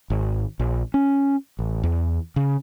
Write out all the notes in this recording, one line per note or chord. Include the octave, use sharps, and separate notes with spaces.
G#1
A#1
C#4
A1
E2
C#3